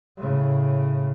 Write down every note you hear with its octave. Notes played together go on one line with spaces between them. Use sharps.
A2 C#3